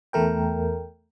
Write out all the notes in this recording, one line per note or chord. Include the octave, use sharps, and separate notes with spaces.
E2 A3 A#4 G5